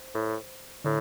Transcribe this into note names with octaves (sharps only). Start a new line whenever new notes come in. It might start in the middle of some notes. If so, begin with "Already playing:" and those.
Already playing: C5
A2
A2 D3